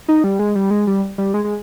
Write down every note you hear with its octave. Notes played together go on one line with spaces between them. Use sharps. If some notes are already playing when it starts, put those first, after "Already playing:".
D#4
G3
G#3
G3
G#3
G3
G3
G#3
G#3